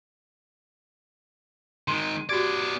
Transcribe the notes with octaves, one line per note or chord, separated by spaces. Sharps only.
D#3 G#3 C6
B3 F#4 G4 D5 G#6